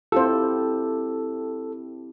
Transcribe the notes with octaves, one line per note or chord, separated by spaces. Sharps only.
C4 E4 F4 G4 A4 C5